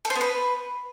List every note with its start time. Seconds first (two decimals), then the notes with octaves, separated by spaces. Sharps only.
0.05 A4
0.10 C5
0.15 B3
0.21 B4